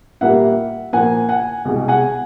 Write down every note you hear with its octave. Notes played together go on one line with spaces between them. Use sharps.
A#2 G3 A#3 E5 F#5
A#2 F3 A#3 F#5 G#5
F#5 G#5
C2 B2 G#3
F#5 G#5